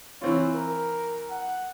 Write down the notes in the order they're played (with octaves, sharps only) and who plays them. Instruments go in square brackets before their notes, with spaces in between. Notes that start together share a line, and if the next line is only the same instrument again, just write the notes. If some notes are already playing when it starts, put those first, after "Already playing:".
[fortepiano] E3 C4 F4 [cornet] C#5
[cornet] A#4
F#5